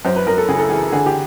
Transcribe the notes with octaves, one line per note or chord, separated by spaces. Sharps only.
F#2 C5
B4
F#2 A#4
A4
C#3 G#4
A4
E3 G#4
D3 G#4
G4